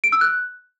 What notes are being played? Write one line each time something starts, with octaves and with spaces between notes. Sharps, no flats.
D7
E6
F#6